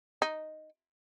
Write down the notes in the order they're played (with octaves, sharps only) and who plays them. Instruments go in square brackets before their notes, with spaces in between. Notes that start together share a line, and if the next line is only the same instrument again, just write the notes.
[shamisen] D#4